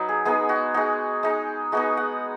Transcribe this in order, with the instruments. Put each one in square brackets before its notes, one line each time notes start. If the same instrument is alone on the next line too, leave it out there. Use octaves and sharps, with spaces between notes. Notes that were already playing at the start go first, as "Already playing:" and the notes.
Already playing: [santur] F#3 D#4 B4
G#4
G#3 B3 D#4 G#4
F#4
G#3 D#4 F#4
G#3 D#4
G#3 B3 D#4 F#4
F#5